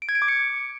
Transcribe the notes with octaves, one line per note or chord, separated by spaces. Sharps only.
D7
G#6
D7
D6
C#7